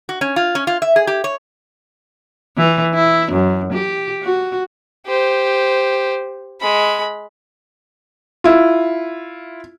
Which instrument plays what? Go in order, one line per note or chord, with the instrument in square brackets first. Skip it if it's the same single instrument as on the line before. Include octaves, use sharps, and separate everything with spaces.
[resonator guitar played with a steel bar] F#4
C#4
F4
C#4
F4
E5
G#4
G4
C#5
[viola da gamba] E3
E4
F#2
G4
F#4
[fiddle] G4 C5
G#3 B5
[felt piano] E4 F4